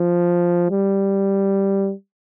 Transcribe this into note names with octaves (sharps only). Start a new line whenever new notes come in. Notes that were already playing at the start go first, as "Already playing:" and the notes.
Already playing: F3
G3